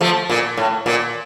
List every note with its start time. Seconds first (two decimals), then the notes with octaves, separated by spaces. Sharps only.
0.01 F3 A3
0.30 A#2
0.57 A2
0.86 A#2